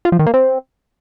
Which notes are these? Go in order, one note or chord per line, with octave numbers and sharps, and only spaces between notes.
F4
F3
D#3
A#3
C4